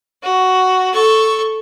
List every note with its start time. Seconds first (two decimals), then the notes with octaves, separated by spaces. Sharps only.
0.23 F#4
0.93 A4 C#6